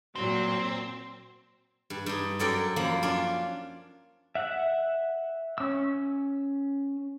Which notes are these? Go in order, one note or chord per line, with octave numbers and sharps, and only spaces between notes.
A#2 F#3 C4
G2
G2 D#4
F#2 F#3 A4 A#4 D5 G5
F#2 F3 A#3 B5
C#4 D4 F4
E5 F#5
C#4 E6